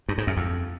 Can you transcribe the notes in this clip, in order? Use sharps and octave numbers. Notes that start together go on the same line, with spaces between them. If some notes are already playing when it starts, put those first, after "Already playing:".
G2
G#2
F#2
F2